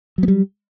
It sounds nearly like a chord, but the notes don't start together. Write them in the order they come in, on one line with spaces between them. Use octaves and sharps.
F#3 B3 G3